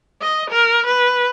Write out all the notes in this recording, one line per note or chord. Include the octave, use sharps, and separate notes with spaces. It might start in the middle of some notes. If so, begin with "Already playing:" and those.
D#5
A#4
B4